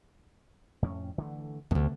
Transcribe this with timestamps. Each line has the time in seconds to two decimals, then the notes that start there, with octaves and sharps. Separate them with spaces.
0.82 F2 A2 C#4
1.18 D3 E3 A3
1.71 D2 G2 C3 A3 B3